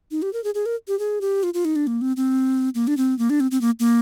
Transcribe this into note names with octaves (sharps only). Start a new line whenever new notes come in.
D#4
G4
A#4
G#4
G#4
A#4
G4
G#4
G4
F4
F4
D#4
D4
A#3
C4
C4
A#3
D4
C4
A#3
D4
C4
C4
A#3
A#3